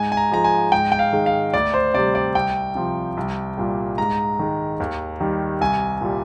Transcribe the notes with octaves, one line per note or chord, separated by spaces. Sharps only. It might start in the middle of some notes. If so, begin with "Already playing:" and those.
Already playing: G#2 G#5
G#5
A#5
F3 G#3 A#5
G#5
G#2 G5
G5
F5
D#3 G#3
F5
D2 D5
C5
C3 G3 D5
D5
C2 G5
C3 F3
C2
A#2 G3
G#2 A#5
D#3 G#3
D#2
D#3 G3
C2 G#5
A#2 G3